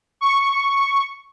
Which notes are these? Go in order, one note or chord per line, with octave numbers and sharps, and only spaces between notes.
C#6